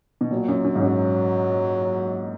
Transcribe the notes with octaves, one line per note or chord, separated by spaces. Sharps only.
B2
A#2 F#3
F#2
F#2
G#2
F#2 F#3